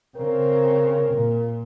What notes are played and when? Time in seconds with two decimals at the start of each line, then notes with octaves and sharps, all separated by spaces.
0.17 C#3 C4 A#4
1.13 A#2